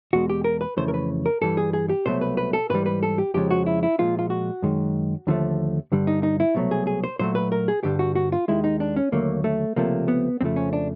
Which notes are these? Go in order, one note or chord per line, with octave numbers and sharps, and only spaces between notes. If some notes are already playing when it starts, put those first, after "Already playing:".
E2 B2 G#3 F#4
G4
A#4
B4
F2 C#3 E3 A3 C5
A#4
B4
A#4
G2 E3 G3 A4
G#4
G#4
G4
C2 B2 F#3 A3 C5
B4
B4
A4
G#2 E3 G3 B4
B4
A4
G4
F2 C#3 F3 G#3 G4
F#4
E4
E4
A#2 F3 G#3 F4
F4
F#4
F#2 D#3 G#3
D#2 D3 F3 A3
G2 D3 G3
D#4
D#4
E4
C2 B2 F#3 A3
G#4
G#4
C5
A#2 F#3 A3 C5
B4
A#4
G#4
G2 D3 G3 G4
F#4
F#4
F4
D#2 D#3 G#3 E4
D#4
D4
C#4
D#2 D3 F#3 A3 A#3
A3
C#2 C3 F3 A3 A#3
B3
F2 C#3 F3 A3 C4
C#4
D4